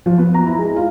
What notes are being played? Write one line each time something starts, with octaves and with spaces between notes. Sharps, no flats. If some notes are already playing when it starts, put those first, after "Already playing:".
F3
B3
A#5
E4
G#3
F4